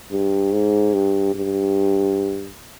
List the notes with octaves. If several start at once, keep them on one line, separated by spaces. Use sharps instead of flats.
G2
G#2
G2
G2